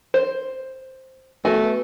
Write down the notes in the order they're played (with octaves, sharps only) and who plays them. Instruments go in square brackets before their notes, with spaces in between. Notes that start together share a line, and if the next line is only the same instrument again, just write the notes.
[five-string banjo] C5
[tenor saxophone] A3 [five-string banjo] B3 F#4 G#5